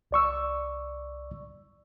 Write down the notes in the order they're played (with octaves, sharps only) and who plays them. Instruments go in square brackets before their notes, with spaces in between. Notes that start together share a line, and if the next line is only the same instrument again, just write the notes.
[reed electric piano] C2 D5 C#6 E6